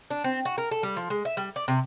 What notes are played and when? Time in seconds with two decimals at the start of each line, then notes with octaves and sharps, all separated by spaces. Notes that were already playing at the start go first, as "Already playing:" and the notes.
0.10 D4
0.24 C4
0.45 F#4
0.58 A#4
0.71 A4
0.83 G3
0.97 F3
1.10 G#3
1.25 E5
1.37 G3
1.56 D5
1.68 C3